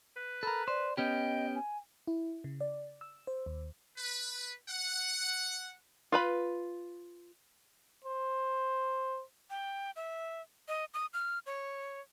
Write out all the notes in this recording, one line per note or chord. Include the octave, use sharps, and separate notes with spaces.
B4
A4 A#4 B5
C5 D5
B3 C#4 G4 D#5 G5
G#5
E4
C#3
D5
E6
C5
D#2
B4
F#5
F4 B4 B5
C5
G5
E5
D#5
D#6
F6
C#5